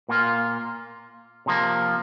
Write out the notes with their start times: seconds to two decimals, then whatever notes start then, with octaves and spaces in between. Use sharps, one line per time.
0.09 A#2 A#3 F4
1.46 C3 F3 A#3